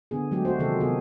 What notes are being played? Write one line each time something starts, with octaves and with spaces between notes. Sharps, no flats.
D3 B3 G#4
F#3 G#3 A3 G4
F#4 C5
C3 D#3 F3 C#4 G4 A4
C3 B3 G#4